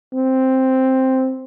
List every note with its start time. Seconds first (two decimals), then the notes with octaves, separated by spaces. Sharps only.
0.14 C4